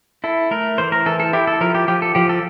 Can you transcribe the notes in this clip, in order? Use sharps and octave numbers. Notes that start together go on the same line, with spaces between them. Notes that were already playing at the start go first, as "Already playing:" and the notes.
E4 A4
A3 A#4
E3 C5
A#4
E3 A4
A4
E4 G4
A4
F3 A#4
G4
F3 G4
A4
F3 G4
A4